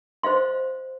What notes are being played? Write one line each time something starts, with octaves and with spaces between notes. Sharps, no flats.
C5 D#5 F5 C6